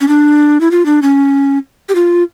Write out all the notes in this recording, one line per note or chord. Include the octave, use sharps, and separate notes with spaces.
C#4
D4
E4
F4
D4
C#4
G4
F4